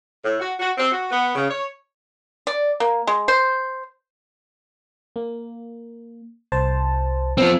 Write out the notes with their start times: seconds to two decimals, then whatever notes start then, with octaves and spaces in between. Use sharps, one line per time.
0.24 A2
0.40 F#4
0.59 F#4
0.78 C4
0.92 F#4
1.11 B3
1.35 C#3
1.50 C#5
2.47 D5
2.80 A#3
3.07 G#3
3.28 C5
5.16 A#3
6.52 C2 C5 A5
7.37 F3 B3 C4